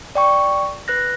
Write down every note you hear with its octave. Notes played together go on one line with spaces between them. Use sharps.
D5 G5 C#6
B4 F#6 A#6